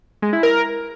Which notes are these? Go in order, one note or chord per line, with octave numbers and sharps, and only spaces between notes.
G#3
E4
A#4